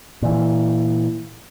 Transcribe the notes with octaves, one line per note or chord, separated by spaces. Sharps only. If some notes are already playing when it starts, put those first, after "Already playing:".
A#2 E3